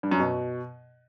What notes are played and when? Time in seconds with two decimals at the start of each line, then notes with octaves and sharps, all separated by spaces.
0.03 G2
0.11 F#2
0.20 B2